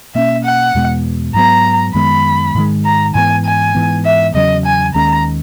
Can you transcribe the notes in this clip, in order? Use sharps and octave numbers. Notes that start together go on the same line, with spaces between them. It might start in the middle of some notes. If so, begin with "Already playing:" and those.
B2 A#3 C#4 E5
F#5
E2 B2 G#3 B3
G#2 F#3 B3 A#5
F#2 D#3 G#3 B3 B5
G#2 D#3 G#3
A#5
G#2 E3 B3 G#5
G#5
G#2 E3 B3
E5
E2 C#3 F#3 C#4 D#5
G#5
D#2 D#3 G#3 C#4 A#5